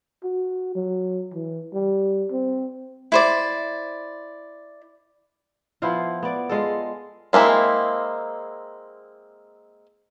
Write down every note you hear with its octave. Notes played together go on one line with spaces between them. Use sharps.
F#4
F#3
E3
G3
C4
E4 C5 D5
F3 B3 E4 F4
B3 D5
G#3 F4 A4
G#3 A#3 C4 E4